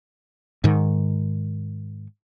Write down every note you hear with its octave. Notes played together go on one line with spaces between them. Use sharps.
G#2 D#3